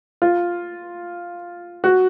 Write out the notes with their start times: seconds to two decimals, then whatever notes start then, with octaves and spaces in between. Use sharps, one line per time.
0.22 F4
1.84 F#4